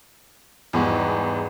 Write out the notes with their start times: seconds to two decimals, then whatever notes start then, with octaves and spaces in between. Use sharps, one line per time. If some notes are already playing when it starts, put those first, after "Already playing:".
0.73 E2 G#2 G3 B3 F#4